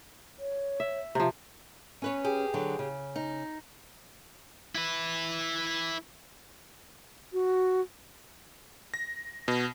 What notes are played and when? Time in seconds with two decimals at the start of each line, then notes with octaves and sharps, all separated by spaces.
0.39 C#5
0.80 E5
1.15 C3 F3
2.02 C#4 B4 C#5
2.24 G4 G#4
2.54 D3 F#3
2.79 C#3
3.16 D#4
4.75 E4 B4
7.33 F#4
8.94 A#6
9.48 B2